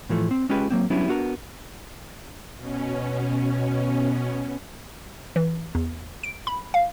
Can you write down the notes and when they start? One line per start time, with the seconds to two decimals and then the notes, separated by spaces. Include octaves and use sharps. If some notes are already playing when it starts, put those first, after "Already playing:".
0.09 A2 E3 F3 A3
0.31 C4
0.49 G#3 C#4 F4 G4 G#4 B4
0.70 F#3 A#3 C4
0.90 F#3 G3 B3 C#4 D4 E4
1.08 B3 D4 F#4 G#4 A#4
2.57 B2 C#4
5.36 E3
5.75 E2
6.23 D7
6.47 B5
6.74 F5